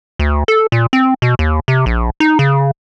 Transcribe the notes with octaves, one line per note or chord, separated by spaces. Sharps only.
D2
A4
A#2
C4
B2
D#2
C3
A#1
D#4
C#3